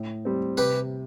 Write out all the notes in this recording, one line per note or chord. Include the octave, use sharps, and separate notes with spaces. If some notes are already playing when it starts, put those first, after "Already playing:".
Already playing: A2
G3 C4
C3 G4 B4